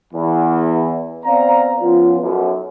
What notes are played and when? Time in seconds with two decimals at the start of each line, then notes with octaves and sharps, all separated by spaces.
0.14 E2
1.25 B3 C4 D5 F5 A#5
1.81 F3 B3 C#4 F4
2.21 B1 F#2